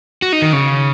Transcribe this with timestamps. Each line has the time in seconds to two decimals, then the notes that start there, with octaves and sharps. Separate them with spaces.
0.22 F#4
0.33 D#4
0.42 D#3
0.53 C#3